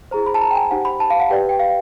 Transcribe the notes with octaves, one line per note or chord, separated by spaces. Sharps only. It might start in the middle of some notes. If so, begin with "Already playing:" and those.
E4 G#4 C5 A#5
B5
A5
A#5
G5
G#5
D#4 G4 C5 F#5
B5
A5
F5
F#5
G4 B4 D5 G5
G5
F5